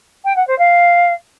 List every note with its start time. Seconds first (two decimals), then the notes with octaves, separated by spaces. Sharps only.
0.24 G5
0.36 F#5
0.47 C5
0.58 F5